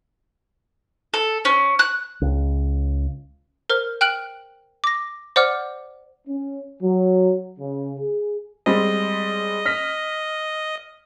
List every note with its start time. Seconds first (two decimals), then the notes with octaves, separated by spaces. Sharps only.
1.14 A4
1.45 C#4
1.79 F#6
2.21 C#2
3.70 A#4 C5 F6
4.01 G5 F6 F#6 D7 F#7
4.84 D6 A#6
5.36 C5 D5 F#5 D6 F6
6.27 C#4
6.82 F#3
7.59 C#3
7.99 G#4
8.66 G3 G#3 C4 D#5
9.65 F6 A#6 B6